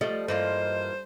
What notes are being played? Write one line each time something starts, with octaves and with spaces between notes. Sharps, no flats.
F3 G3 A3 D#5
G2 E3 A#3 F4 C5 D#5